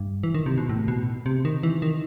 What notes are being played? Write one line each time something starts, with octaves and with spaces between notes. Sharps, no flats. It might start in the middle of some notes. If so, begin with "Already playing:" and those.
Already playing: G2
E3
D#3
C3
B2
A2
B2
C3
D#3
E3
D#3